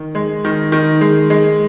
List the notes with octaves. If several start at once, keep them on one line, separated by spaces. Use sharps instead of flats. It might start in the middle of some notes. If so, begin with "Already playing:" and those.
Already playing: D#3
G#3
D#3
D#3
G#3
G#3